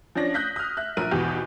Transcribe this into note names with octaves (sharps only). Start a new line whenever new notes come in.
F3 C#4 D4 A#6
D#6 F#6 G6 A#6 B6
D#6 F6
E5 F#6
A#1 A#4 D#7
G#1 E2 B2 G4